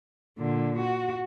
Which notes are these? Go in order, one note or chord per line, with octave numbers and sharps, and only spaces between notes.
A#2 D3
F#4